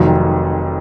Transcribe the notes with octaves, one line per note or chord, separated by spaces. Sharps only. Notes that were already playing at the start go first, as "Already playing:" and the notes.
Already playing: F1 F2 D#3 F#3